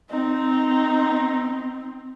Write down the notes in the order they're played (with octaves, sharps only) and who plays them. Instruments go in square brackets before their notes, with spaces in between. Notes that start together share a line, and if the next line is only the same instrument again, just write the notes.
[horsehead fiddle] C4 [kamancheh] D#4